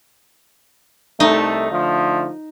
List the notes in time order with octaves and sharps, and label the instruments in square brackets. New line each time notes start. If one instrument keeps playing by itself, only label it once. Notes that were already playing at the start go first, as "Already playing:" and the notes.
[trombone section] C2 A3 [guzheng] D#4
[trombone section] D3 F3 A3